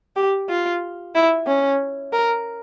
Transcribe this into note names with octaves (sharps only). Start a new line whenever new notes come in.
G4
F4
E4
C#4
A#4